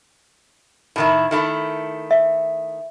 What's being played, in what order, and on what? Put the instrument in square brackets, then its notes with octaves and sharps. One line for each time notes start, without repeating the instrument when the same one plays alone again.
[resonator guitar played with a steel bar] A2 D#3 E4
D#3 A3 E4
[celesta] E5